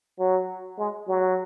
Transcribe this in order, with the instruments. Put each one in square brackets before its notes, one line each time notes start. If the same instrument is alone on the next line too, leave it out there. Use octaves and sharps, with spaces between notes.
[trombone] F#3
G#3
F#3